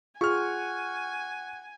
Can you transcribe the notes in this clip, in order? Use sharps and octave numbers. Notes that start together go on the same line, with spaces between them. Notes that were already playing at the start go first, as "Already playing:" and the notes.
F4 G#4 F#5 G#5 C#6 F6